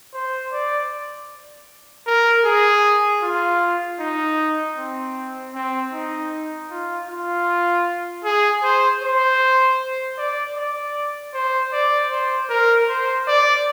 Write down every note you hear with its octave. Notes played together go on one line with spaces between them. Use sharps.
C5
D5
A#4
G#4
F4
D#4
C4
C4
D#4
F4
F4
G#4
C5
C5
D5
D5
C5
D5
C5
A#4
C5
D5